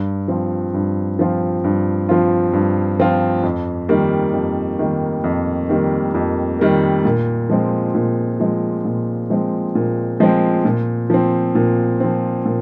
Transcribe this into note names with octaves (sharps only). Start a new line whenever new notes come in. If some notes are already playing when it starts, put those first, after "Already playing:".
Already playing: G2
F3 C4 F4
G2
F3 C4 F4
G2
F3 C4 F4
G2
F3 C4 F4
F2
D#3 G3 A#3
F2
D#3 G3 A#3
F2
D#3 G3 A#3
F2
D#3 G3 A#3
A#2
F3 G#3 C4
A#2
F3 G#3 C4
A#2
F3 G#3 C4
A#2
F3 G#3 C4
A#2
F3 C4
A#2
F3 C4
A#2